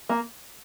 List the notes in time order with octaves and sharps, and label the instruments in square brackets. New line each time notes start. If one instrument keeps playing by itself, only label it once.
[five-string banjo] A#3